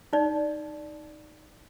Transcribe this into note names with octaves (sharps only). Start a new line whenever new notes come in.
D#4 D5